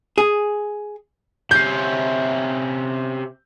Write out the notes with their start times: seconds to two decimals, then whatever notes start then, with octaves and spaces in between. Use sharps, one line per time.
0.18 G#4
1.51 C3 C#4 G6 C7